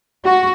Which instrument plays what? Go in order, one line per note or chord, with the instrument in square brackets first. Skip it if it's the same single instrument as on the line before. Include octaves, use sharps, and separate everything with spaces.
[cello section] F#4